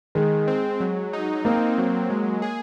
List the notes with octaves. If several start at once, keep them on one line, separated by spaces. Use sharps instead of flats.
D#3 G#3
C4
F#3
D#4
A#3 C4
F#3
G#3
G#4